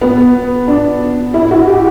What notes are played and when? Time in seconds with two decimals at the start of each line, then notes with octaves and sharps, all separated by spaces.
0.01 B3
0.68 D4
1.34 E4
1.44 E4
1.51 F#4
1.68 G4